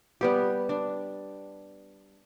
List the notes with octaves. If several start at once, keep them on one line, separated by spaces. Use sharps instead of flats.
G3 B3 G4
D4